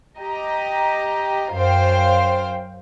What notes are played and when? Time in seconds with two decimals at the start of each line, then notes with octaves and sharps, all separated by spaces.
0.19 G4 D#5 A#5
1.54 F#2 C5 F5 G5